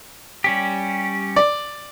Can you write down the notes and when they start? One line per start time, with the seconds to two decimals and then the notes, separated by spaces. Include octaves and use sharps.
0.44 G3 C#4 G4
1.36 D5